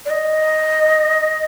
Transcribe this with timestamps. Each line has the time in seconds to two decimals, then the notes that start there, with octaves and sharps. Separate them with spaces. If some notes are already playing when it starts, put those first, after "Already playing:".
0.06 D5
0.10 D#5